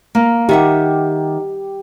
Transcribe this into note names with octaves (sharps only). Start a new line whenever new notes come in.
A#3
D#3 G4 E5 F#5